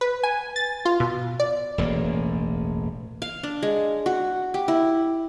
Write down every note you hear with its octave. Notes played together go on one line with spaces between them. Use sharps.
B4
G#5
A6
F4
B2
D5
E1 A1 F#2 A#3
F5
D4
G#3
F#4
G4
E4